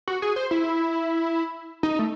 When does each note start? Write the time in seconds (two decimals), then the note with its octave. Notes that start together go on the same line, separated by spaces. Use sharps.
0.08 F#4
0.22 G#4
0.36 C5
0.51 E4
1.83 D#4
1.99 A3